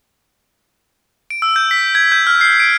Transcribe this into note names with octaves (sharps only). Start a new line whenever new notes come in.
D7
E6
G6
B6
G#6
G6
F6
C7
D7